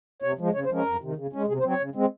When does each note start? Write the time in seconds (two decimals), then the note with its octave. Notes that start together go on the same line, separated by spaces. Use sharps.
0.22 C3 C#5
0.39 F3 G#3
0.54 C#3 C#5
0.65 C5
0.70 F3 G#3 C#4 A#4
0.86 F2
1.01 C3 D#3
1.17 C#3
1.33 G#3 C#4
1.48 C3 G#4
1.59 C5
1.64 F#3 C4
1.70 C#5
1.80 C#3
1.95 G#3 C4